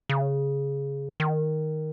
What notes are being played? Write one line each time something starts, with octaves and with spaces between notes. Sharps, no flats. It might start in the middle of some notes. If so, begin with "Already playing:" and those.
C#3
D#3